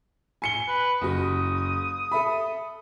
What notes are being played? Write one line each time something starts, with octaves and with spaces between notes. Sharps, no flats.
G#5 C#7 G7
B4
F#1 F#4 D#6
A4 E5 B5